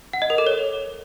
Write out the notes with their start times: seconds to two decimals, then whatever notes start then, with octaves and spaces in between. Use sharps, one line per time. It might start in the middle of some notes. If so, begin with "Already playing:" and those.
0.13 F#5
0.22 D#5
0.30 A#4
0.38 A4
0.47 C#5